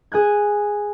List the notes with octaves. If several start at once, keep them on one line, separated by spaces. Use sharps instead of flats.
G#4 G#5 F#6 G#6